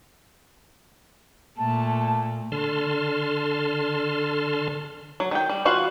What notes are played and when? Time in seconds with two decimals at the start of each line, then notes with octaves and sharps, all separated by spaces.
1.58 A#2 A3 A5
2.52 D3 A5 C6 F6
5.20 F#3
5.31 D#3 G5
5.49 G3
5.65 E3 F4 F#4 B4 F5